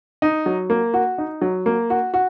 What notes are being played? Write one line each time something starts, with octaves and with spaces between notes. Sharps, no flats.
D#4
F#3
A#3
F#4
D#4
F#3
A#3
F#4
F#4